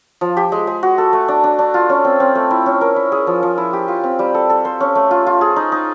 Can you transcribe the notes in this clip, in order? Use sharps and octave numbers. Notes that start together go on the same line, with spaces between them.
F3
G4
G#3
G#3
F#4
A4
A3
D4
D4
D4
F4
C#4
C4
C4
A3
E4
C#4
A#4
E4
G#4
F3
F3
E4
G4
F4
C4
G3
A4
A4
C5
C#4
A3
F4
F4
G#4
D#4
D#4